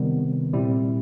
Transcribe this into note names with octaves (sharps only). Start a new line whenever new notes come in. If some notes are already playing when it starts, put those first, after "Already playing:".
Already playing: C3 D#3 G3 B3
A#2 G3 C4 E4